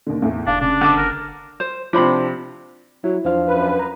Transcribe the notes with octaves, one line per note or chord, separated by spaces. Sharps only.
D#2 D3
E2 A2
F1 D4 F5 A5
F1 C#3 D4
D3 A5 D6
F#1 A#4
C5
C3 F3 D4 C5 B5
F#3 E4
E2 F3 D4 F5
F#2 B4
A#5